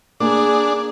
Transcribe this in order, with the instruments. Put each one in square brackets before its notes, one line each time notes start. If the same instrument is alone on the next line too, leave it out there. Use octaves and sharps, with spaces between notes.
[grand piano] A#3 [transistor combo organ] D4 [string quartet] G#4